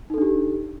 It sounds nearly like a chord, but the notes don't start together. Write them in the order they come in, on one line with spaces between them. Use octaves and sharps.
D#4 A4 D4 G4